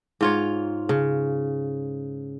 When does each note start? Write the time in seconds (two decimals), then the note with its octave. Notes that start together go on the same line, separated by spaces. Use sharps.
0.21 G#2 F4 C#5
0.89 C#3